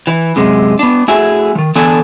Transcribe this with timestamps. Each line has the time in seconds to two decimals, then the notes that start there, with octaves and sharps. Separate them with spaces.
0.07 E3
0.36 F#2 C3 G#3
0.79 B3 D4
1.08 A3 E4 F#4 G#4 E5 G#5
1.55 D#3 F3
1.75 D3 E3 B3 D4 A4 G#5